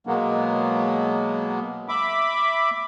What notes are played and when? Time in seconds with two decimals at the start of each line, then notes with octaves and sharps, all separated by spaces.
0.07 B2 F#3 G#3 A#3 B3
1.89 E5 B5 D6